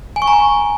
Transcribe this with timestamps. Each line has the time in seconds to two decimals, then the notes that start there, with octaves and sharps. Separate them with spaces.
0.16 G#5
0.22 C#6
0.28 A#5
0.33 G#5